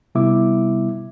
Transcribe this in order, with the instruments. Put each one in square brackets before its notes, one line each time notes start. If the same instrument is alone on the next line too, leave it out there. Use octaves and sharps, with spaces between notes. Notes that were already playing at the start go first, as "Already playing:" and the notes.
[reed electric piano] C3 G3 B3 E4 E5 D6